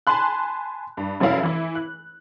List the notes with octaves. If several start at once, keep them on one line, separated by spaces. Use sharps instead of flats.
G#5 A5 B5 C6 F#6
G2
F1 F#2 C#4 E4 F5
E3 E4
F#6